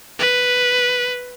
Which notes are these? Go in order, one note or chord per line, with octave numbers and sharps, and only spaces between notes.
B4